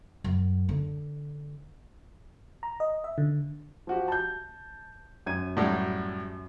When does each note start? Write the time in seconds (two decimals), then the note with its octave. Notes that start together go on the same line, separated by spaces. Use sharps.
0.24 F#2
0.69 D3
2.63 A#5
2.80 D#5
3.04 E5
3.18 D3
3.87 F3 F#4 G4
4.08 A5 G6
5.26 F#2 G#6 D#7
5.57 A2 F#3 G3